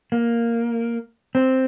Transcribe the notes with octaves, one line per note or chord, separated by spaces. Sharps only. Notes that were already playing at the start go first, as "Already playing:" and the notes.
A#3
C4